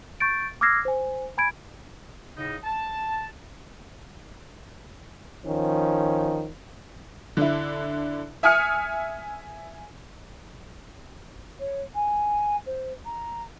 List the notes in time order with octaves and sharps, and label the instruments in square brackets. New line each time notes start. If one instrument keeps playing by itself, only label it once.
[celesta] C#6 G6 A6 D7
D6 E6 F6 G#6 A#6 C7
C5 G#5
G#5 B5 G#6 D7
[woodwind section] A2 C#3 D#4
A5
[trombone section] D#3 F3 C#4
[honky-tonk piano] D3 E4
E5 G#5 D#6 F6 C#7
[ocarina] C#5
G#5
C5
A#5